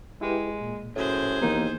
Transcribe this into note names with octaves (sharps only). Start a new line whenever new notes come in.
G#3 E4 G4 B4
A#2
F#2 A2 G#4 C5
D#2 E3 A#3 B3 D#4